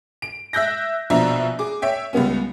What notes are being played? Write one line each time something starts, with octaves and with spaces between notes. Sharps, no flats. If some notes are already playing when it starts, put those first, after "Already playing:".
D7
E5 E6 F#6 G6 A#6
A#1 B2 F3 D4 E5 A#5
G#4 D6
C#5 E5 G5
C#2 G3 B3 C#4